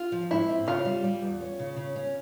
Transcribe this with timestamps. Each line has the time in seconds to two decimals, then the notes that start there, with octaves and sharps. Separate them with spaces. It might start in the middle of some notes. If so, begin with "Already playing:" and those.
Already playing: F4
0.12 F3
0.31 G#2 E4
0.50 C4
0.67 C#3 F4
0.85 G3
1.04 G3
1.22 E2
1.41 C#4
1.59 C#3
1.77 C#3
1.96 C#4